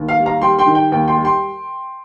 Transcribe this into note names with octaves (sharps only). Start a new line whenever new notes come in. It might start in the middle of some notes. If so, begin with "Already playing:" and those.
Already playing: D#2
F5
G3
F5 A#5
G3 G5 C6
G5 C6
D#3
G5
D#2 G5
G5 C6
G3
G5 C6